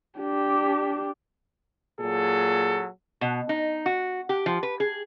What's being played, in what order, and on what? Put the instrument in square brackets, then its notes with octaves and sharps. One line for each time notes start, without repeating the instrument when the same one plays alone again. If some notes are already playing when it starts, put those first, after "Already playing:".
[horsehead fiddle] D4 G4
[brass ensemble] A#2 F#3 G#4 A4
[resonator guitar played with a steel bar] B2
D#4
F#4
G4
F3
B4
G#4